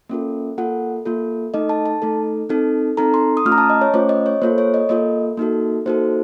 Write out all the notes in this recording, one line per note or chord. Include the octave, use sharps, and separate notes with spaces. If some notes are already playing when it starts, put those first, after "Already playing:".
A#3 C#4 F4 A4
A#3 F4 A4 F#5
A#3 F4 A4
A3 D#4 A4 D#5
A5
A5
A3 D#4 A4
C4 D#4 A4
C4 D#4 A4 A#5
C6
D#6
A3 C#4 F4 F6
A#5
A5
D#5
C#5
A3 C#4 F4 C5
D#5
C#5
A#3 F4 A4 C5
C#5
D#5
A#3 F4 A4 D#5
A#3 D#4 F#4 A4
A#3 D#4 F#4 A4 C5